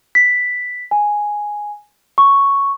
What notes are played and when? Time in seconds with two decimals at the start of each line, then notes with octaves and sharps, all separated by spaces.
0.15 B6
0.91 G#5
2.18 C#6